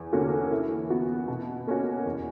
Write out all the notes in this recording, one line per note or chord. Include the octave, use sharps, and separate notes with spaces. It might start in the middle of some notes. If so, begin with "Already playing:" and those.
Already playing: E2
D3 A#3 C#4 F#4
E3
B3 F#4
B2
A#3 C#4 F#4
E2